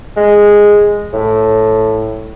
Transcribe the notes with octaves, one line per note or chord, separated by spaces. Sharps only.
G#3
A2